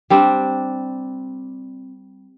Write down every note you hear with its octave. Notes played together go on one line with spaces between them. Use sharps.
G3 C4 D4